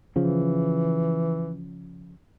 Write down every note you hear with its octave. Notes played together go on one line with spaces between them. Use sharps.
C#3 E3 F3